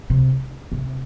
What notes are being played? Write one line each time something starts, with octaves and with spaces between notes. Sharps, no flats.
C3
C3